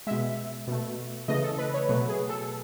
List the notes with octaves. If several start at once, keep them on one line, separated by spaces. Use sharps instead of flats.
B2 G#3 E5
B2 A3
C#3 E3 A3 D#5
A4
B4
C#5
B2 F#3 A3 B4
G#4
A4